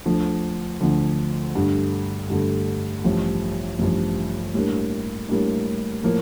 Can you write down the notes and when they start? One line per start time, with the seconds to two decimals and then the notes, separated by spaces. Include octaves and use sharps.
0.06 D2 D3 F3
0.81 D2 D3 F3
1.55 G2 D3 A3
2.30 G2 D3 A3
3.04 A1 G2 F3
3.79 A1 G2 F3
4.54 A2 G3 A#3 D4
5.29 A2 G3 A#3 D4
6.04 A2 F3 A#3